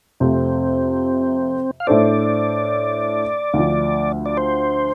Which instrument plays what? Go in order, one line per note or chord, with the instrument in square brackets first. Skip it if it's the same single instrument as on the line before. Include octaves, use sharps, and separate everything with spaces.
[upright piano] F2 C3 A3 [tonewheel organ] C4
[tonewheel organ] F5
[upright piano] A2 A3 D4 A4 C5 [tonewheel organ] D5
[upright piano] D2 D3 F3
[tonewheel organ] D5
C5